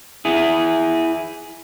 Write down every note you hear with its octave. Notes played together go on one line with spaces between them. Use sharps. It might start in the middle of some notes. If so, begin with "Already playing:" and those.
E4 G#4